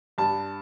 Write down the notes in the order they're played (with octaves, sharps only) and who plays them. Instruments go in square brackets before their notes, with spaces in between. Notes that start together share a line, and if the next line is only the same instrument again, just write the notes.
[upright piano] G2 A5